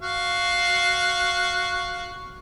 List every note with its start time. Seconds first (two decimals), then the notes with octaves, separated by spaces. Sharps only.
0.02 F#4 F5